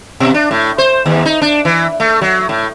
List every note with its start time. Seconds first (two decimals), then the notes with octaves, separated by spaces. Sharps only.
0.20 B2
0.34 D4
0.51 A2
0.78 C5
1.06 D#2
1.26 D#4
1.42 D4
1.65 E3
2.00 A3
2.22 F#3
2.49 A2